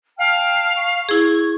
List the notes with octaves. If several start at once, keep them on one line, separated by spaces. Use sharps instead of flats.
F5 G5 A5 F6
C#6
E4 G#4 G#6